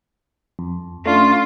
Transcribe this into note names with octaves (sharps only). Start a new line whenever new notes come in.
F2
A3 C#4 D4 F4 C6